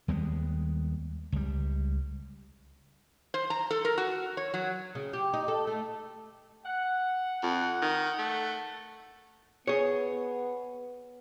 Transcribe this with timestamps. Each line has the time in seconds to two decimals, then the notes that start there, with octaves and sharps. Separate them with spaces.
0.08 D#2 G3 G#3 B3
1.32 C#2 G3
3.34 C5
3.50 A#5
3.71 A4
3.85 A#4
3.98 F#4
4.37 C#5
4.54 F#3
4.95 C#3
5.13 G4
5.34 D#4
5.48 A4
5.67 A3
6.65 F#5
7.43 F2
7.82 D#3
8.19 A3
9.67 B3 G#4 C#5